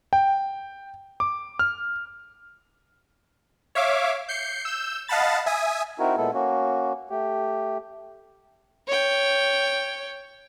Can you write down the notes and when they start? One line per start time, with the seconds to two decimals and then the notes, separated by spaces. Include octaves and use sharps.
0.13 G5
1.20 D6
1.59 F6
3.75 C#5 E5 F5 D6
4.29 G6 C7 C#7
4.65 E6 G6
5.08 D#5 F5 F#5 A5 B5 A6
5.46 E5 G#5 D#6
6.00 C4 D#4 E4 F#4 A#4
6.17 A#2 G#3 B3 E4 A4
6.34 A#3 C#4 F#4
7.10 A3 G4
8.87 C#5 G5